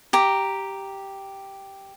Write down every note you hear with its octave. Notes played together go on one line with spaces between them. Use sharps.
G4 A#5